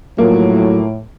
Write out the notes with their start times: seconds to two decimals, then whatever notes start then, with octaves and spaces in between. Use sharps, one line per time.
0.18 A2 F3 F#3 A#3